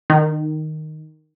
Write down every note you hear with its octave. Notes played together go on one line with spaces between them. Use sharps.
D#3